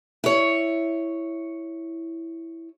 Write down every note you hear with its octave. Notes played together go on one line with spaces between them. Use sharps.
E4 C#5